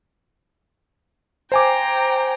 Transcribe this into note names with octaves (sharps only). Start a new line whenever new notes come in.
C5 G5 G#5 A#5 D6